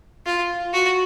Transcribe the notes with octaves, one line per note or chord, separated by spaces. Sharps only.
F4
F#4